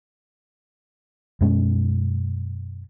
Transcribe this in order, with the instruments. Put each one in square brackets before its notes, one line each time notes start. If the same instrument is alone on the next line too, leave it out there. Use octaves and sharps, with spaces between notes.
[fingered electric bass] F#2 B2 G#3 C#4